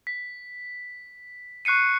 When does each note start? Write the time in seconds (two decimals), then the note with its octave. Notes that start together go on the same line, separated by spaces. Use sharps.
0.07 B6
1.65 C#6 F#6 C7 C#7 D#7